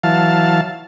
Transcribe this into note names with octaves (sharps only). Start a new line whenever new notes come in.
E3 F#3 F5 A5